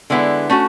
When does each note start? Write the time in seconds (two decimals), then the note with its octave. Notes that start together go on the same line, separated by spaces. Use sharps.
0.10 D3 G#3 B3 E4
0.50 A3 C#4 F#4